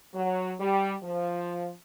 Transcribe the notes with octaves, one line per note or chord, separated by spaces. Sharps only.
F#3
G3
F3